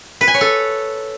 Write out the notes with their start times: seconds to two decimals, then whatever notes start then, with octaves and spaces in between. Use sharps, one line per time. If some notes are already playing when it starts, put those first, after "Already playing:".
0.21 B4
0.28 G#5
0.34 C#5
0.41 A4